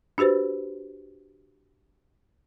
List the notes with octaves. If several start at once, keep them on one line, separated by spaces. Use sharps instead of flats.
D4 F#4 G4 B4 C5